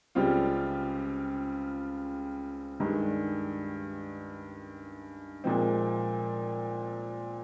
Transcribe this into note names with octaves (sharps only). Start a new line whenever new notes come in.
C#2 C#3 G3 C4 F4
G2 D#3 G#3
A#2 F3 G#3 C4